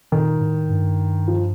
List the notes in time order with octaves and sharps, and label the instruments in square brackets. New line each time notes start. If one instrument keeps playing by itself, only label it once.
[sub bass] A#2 [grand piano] D#3
[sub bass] A2
G2
[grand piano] F3